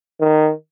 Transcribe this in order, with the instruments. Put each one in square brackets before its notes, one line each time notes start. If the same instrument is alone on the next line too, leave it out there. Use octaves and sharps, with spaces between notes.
[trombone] D#3